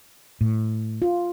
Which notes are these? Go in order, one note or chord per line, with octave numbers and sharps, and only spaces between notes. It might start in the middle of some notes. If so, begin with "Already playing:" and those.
A2
F4